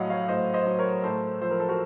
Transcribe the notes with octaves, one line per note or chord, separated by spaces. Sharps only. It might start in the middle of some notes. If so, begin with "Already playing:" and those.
Already playing: A2 F#3 D#5 F5 F#5
C#5 F5
A2 C5 D#5
C5 D#5
F#3
A#4 C#5
A2 A4 C5
F3 C5
A#4
A4
F#4 A#4